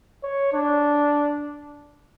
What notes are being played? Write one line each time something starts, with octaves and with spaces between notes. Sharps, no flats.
C#5
D4